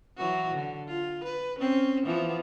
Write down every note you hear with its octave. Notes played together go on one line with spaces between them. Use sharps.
E3 F#3 F#4
D3
F4
B4
C4 C#4
E3 F3 B3